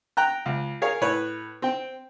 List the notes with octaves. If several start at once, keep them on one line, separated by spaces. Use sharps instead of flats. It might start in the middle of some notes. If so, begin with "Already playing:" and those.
G5 A#5 F#6
C#2
G#4 A#4 C#5 F5 G#5
A2 B4 C#5
C4 G5